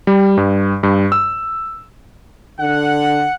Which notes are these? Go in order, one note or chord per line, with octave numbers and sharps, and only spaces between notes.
G3
G2
G2
E6
D3 F#5